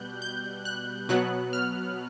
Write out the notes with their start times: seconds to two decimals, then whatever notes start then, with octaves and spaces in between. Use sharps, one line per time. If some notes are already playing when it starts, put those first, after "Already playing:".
Already playing: B2 G3 F#6 G6
0.22 G6
0.65 F#6
1.09 B2 F#3 B3 F#6
1.53 F6